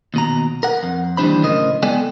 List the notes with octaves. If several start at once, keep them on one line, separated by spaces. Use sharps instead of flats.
D#2 B2 A#5
A#4 F#5
F2
D#2 E3 G3 D4 C5 B5
F#2 A2 C#3 A#4 C5 D#5
G#3 B3 A4 D5 G5 G#5